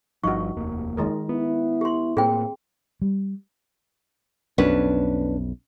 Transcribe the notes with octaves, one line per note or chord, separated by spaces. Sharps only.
G1 G2 F3 D#4 F#4 C#6
F1 D#2 A#3
D#3 G#3 A#4
B3 E4
G4 C6
A2 A#3 C4 G#4 G5
G3
B1 F2 C#4 D4 B4